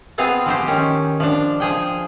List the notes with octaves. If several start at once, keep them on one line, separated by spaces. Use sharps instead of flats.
B3 C4 F4 G#4 F5
F3 G4 C5
D#3 C#4
F3 D4
F3 G#4 G5